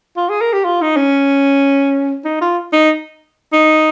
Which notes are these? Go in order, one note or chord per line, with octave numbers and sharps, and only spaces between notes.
F4
G#4
A#4
G4
F4
D#4
C#4
D#4
F4
D#4
D#4